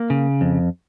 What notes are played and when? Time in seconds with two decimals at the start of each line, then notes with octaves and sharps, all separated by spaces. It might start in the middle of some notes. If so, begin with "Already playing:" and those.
Already playing: A#3
0.10 C#3
0.41 F2